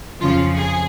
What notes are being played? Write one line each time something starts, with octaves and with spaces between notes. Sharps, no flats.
F2 C#3 F3 F4
G#4